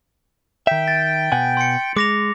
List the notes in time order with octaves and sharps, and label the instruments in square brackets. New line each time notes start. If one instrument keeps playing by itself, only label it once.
[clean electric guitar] D#3 E5 [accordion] G5 [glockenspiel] B6 D7
[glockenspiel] A6
[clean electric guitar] B2 F#5 G#5
[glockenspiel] C6 C#7
[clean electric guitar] G#3 [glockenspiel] D6 A#6 F7